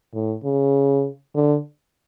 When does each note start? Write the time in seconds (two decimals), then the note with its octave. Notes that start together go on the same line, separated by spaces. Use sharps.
0.13 A2
0.44 C#3
1.35 D3